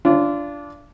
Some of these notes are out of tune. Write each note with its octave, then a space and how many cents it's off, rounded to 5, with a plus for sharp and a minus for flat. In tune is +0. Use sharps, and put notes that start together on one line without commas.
D4 -15 F4 -25